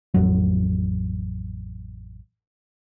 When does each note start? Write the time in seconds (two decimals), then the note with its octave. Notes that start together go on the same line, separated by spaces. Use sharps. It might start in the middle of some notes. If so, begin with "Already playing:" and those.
0.14 A1 F2 F#3